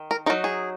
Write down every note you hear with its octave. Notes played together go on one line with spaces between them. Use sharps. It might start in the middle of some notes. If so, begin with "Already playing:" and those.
Already playing: D#3
A#4
F#3 D#4 A#4
G#4